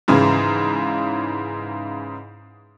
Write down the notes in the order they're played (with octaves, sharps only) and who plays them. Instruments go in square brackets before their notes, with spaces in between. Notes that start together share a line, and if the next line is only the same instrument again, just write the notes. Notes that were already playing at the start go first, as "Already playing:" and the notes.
[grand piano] G#2 C#3 E3